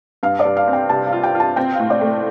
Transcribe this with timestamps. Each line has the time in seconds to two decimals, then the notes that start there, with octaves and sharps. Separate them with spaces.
0.23 G2 F5
0.39 D5
0.45 G2
0.56 F5
0.68 C4
0.73 G5
0.89 C3 A5
1.07 F5
1.12 F4
1.23 G5
1.35 F4 A5
1.56 C4 G5
1.73 F5
1.79 A2
1.90 D5
2.01 A3